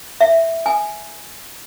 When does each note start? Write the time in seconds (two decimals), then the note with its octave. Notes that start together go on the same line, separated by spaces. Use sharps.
0.21 E5
0.66 G#5